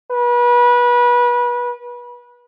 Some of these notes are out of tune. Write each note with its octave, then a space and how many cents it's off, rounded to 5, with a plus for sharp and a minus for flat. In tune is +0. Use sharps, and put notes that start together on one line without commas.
B4 -30